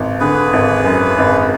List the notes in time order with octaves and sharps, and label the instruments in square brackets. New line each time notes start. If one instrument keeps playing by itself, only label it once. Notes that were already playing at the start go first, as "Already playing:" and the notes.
Already playing: [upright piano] G#1
[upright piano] D3 [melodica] G#4 B4
[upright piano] G#1
F#2
G#1